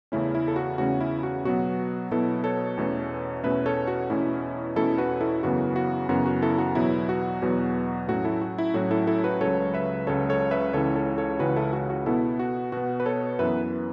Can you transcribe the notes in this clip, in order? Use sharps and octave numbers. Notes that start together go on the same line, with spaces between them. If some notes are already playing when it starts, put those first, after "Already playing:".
E2 C#3 A3 C#4 E4
E4
A4
F#4
E2 C#3 A3 C#4 F#4
E4
F#4
B2 F#3 B3 F#4
B2 F#3 B3 E4 A4
A4 C#5
E2 B2 A3 C#4
E2 B2 A3 C#4 B4 E5
A4 C#5
F#4
E2 B2 A3 C#4 E4
E2 B2 A3 C#4 E4 A4
F#4 B4
E4 A4
F#2 C#3 E3 B3 F#4
F#4
F#2 C#3 E3 B3 F#4
F#4
E4 A4
F#4
E2 B2 F#3 B3 E4
F#4
E2 B2 F#3 B3
A2 F#3 A3 C#4 F#4
E4 A4
F#4
E4
A2 F#3 A3 C#4 F#4
E4 A4
E4 A4
F#4 B4
C#2 C#3 F#3 A4 C#5
B4 E5
C#2 C#3 F#3 A4 C#5
A4 C#5
B4 E5
C#2 C#3 E3 C#4 A4 C#5
A4 C#5
A4 C#5
C#2 C#3 E3 C#4 F#4 B4
E4 A4
F#4
F#4
B2 B3 E4 A4
F#4
B2 B3 F#4
B4
A4 C#5
F#2 E3 B3 B4 E5